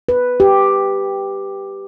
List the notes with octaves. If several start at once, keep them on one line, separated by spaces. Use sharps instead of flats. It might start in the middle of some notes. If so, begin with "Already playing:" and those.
B4
G4